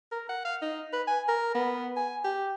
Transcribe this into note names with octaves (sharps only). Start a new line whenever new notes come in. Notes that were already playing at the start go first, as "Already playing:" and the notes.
A#4
F#5
F5
D#4
B4
G#5
A#4
B3
G#5
G4